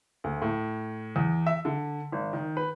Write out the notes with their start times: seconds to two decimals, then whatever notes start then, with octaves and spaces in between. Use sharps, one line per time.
0.24 D2
0.42 A2
1.16 E2
1.47 E5
1.65 D3
2.12 G#1
2.33 D#3
2.57 B4